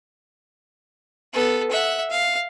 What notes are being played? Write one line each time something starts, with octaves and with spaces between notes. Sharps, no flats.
B3 A4
E5 F#5
F5